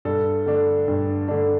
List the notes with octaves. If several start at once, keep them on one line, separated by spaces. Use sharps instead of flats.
G2 A4
D3 A3 D4
G2
D3 A3 D4